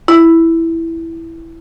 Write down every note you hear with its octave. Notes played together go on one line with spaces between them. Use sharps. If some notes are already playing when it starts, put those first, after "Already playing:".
E4